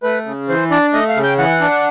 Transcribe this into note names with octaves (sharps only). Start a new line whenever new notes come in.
A3 B4
C#3
E3 C5
D4 D5
A3 D#5
F5
C#3
G5
E3 F#5
D4